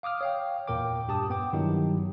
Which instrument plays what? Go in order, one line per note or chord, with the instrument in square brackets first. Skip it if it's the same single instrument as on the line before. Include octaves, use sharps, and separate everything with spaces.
[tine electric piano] F5 D6 D#6 F6
C#5 F5 G5
E2 A#2 A#4 G5 D6
G2 G4 A5 D#6
B3 G5 D6
G2 D#3 F#3 D#4 E4 G4